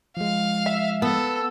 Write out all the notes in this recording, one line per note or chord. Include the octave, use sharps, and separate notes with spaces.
F3 G#3 F5
E5
B3 A4 E6